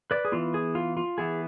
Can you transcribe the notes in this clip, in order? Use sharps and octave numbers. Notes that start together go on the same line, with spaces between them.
B4 D5
G#4
E3 B3 F4
G#4
F4
F4
E3 B3 G#4